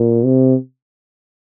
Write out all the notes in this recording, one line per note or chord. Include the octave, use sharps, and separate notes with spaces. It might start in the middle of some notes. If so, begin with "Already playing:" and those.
Already playing: A#2
C3